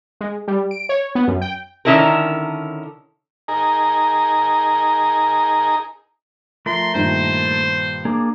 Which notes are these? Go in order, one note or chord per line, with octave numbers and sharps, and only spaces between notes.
G#3
G3
D7
C#5
B3
F#2
G5
D3 D#3 C#4 E4 A4 A#4
D#4 G#4 A#4 A#5
F3 A3 A#4 C6
G2 A#2 D#3 C5
A#3 D4 G#4